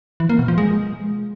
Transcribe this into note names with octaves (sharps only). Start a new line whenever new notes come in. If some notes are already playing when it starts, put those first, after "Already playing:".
E3
A#3
B2
F3
G#3